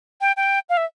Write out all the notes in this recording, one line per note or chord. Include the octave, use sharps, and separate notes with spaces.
G5
G5
F5
E5